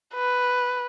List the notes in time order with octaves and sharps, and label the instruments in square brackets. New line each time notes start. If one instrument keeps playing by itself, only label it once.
[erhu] B4